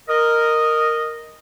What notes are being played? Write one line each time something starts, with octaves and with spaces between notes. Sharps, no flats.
A#4 D#5